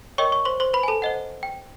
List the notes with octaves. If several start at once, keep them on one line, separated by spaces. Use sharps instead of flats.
A#4 C#5 D#5 G5 C#6
C#5 C#6
C5 C6
C5 C6
B4 B5
G#5
A4 A5
C5 D#5 F#5
G5